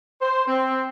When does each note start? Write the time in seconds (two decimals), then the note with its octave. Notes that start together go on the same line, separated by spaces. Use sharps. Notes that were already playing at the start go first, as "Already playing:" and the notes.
0.21 C5
0.48 C4